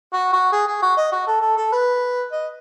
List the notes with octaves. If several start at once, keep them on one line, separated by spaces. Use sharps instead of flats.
F#4
F#4
G#4
G#4
F#4
D#5
F#4
A4
A4
A4
B4
D#5